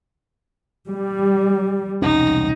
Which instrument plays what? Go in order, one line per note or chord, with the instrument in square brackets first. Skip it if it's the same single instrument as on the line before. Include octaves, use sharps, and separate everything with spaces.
[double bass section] G3
[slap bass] E1 C2 C#4 [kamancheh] D#4